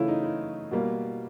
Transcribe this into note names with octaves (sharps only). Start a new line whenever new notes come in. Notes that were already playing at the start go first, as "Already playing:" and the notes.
Already playing: C#3 E3 A3 E4 F4
D#4
E4
B2 G3 A#3